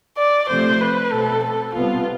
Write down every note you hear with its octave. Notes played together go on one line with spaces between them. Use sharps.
D5
C3 F3 A3 C4 C5
B4
B2 A3 C4 A4
A4
C3 G3 B3 F4